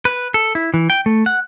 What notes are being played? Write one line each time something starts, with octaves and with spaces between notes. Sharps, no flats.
B4
A4
E4
E3
G5
A3
F#5